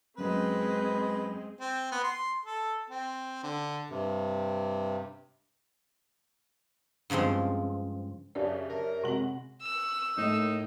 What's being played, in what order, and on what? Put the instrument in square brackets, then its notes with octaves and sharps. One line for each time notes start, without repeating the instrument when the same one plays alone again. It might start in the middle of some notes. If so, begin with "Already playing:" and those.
[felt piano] F#2 F#3 [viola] G#3 C4 [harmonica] B4
[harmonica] C4
B3
C6
A4
C4
D3
[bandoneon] G2 C3
[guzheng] G2 C#3 F3 G#3 C4
[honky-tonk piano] F#2 D4 G4 [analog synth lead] C#3 [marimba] D5
[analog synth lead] A#4
[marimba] C3 C4 [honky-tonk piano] G#3 F#4 F#7
[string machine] C#6 F#6 [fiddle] E6
[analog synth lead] A2 [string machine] A#3 [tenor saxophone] D#4